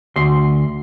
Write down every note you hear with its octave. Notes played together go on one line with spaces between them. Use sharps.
D2 C6